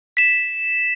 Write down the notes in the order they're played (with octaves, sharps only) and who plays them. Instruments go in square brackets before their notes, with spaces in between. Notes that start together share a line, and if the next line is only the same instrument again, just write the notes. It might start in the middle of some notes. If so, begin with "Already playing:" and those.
[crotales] B6 E7